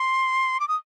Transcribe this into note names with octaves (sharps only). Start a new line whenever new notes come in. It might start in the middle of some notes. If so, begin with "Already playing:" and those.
Already playing: C6
D6
D#6